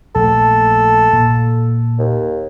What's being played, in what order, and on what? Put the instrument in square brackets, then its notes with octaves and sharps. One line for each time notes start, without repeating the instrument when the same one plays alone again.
[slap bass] A#1 A3 [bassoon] A4
[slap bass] A#2
[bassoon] D#2